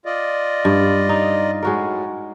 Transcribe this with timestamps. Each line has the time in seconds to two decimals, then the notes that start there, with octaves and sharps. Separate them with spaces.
0.05 F4 D5 D#5
0.65 G2
1.09 D#4
1.63 A2 G#3 F#4 A#4